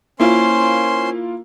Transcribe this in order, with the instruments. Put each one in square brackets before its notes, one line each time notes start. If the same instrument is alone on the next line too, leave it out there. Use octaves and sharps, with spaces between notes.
[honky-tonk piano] A#3 E4 F4 [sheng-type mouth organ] C#4 C5 C6